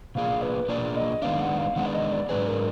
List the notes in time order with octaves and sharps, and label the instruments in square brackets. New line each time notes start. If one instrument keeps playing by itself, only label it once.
[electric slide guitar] B2 A#3 D4 F4 G#4 [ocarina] F5
[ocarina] B4
[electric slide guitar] B2 A#3 D4 F4 G#4 [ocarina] D5
[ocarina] D#5
[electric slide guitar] D#3 G#3 B3 D4 [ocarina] F5
[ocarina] F#5
F5
[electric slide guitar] D#3 G#3 B3 D4 [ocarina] F#5
[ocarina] D5
D#5
D5
[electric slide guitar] G#2 F#3 D4 G#4 [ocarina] B4
[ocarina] A#4